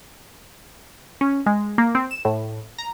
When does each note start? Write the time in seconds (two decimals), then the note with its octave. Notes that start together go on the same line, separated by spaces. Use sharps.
1.21 C#4
1.46 G#3
1.78 A#3
1.95 C4
2.11 E7
2.25 A2
2.78 A#5